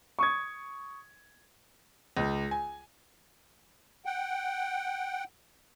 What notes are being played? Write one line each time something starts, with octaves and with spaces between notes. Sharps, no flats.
C#6 D#6 G#6
C#2
G#5
F#5 G5